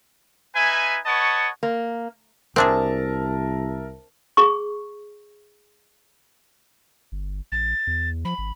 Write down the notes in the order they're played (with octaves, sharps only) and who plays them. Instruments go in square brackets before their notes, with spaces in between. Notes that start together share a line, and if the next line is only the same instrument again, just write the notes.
[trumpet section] D#4 B4 E5 G#5
B4 C#5 D#5 F#5 A5 C#6
[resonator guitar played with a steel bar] A#3
[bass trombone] C2 [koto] C4 D4 G#4 [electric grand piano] A#4 E5 A5
[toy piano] G#4 C#6
[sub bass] G1
[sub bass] A#1 [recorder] A6
[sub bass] E2
[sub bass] F3 [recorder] B5
[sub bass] G#1